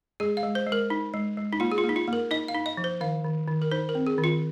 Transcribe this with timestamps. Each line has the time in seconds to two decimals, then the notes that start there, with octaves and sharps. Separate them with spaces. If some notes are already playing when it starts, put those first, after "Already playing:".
0.20 G#3 G#4
0.37 F5
0.43 G#3
0.55 C5
0.67 G#3
0.72 A#4
0.90 D#4
1.14 G#3
1.37 G#3
1.53 D#4
1.60 A#3 F4
1.72 G#4
1.78 F4
1.84 A#3
1.89 D#4
1.96 F4
2.08 A#3
2.13 A#4
2.31 D#4 D#5
2.48 F5
2.55 D#4
2.66 D#5
2.77 F3
2.84 C5
3.01 D#3 F5
3.24 D#3
3.47 D#3
3.62 A#4
3.71 D#4 C5
3.89 A#4
3.95 C4
4.07 G#4
4.18 D#3
4.24 F4